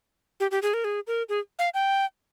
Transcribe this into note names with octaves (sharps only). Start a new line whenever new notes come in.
G4
G4
G#4
A#4
G#4
A#4
G#4
F5
G5